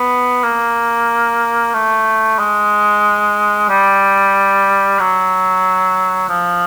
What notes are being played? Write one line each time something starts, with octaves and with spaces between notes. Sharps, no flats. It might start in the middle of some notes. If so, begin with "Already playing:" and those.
Already playing: B3
A#3
A3
G#3
G3
F#3
F3